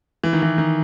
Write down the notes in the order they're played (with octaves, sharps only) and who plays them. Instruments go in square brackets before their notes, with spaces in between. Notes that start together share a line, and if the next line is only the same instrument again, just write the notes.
[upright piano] E3
D#3
E3
D#3